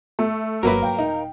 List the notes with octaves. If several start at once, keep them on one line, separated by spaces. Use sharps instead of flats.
A3
G1 F#3 A#3 A#4 B4
G2 F5 G5
D#1 D#4